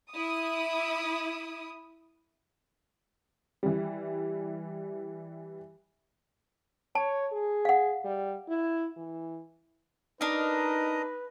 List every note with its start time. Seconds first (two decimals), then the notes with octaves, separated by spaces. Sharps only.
0.12 E4 D#6
3.63 E3 G3
6.95 C#5 A5
7.32 G#4
7.65 F5 F#5
8.04 G3
8.48 E4
8.97 E3
10.21 D4 D#4 A#4 B4 D#5 A#5 D#6